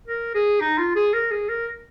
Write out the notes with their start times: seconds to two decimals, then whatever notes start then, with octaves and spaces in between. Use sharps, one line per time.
0.08 A#4
0.35 G#4
0.61 D#4
0.78 F4
0.96 G#4
1.13 A#4
1.31 G#4
1.49 A#4